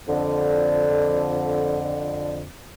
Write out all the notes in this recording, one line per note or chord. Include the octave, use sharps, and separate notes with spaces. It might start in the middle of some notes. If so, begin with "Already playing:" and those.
F2 D3